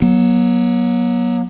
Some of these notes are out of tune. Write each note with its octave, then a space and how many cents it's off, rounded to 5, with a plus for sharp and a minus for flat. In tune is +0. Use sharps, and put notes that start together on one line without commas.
F#3 +0 B3 -45